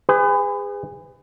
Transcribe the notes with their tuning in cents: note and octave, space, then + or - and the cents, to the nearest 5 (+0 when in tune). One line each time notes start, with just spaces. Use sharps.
G#4 -30 B4 +35